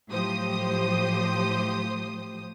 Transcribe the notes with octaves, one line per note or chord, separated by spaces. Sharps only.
A2 F3 F#3 G4 C5 D#6